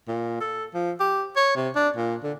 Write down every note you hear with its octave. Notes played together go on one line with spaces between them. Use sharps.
A#2
A4
F3
G4
C#5
C3
D4
A#2
D3